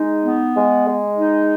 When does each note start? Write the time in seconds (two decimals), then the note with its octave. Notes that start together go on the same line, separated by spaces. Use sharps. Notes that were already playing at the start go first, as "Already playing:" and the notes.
Already playing: G#3 D#4
0.24 B3
0.56 G#3
0.87 G#3
1.17 D#4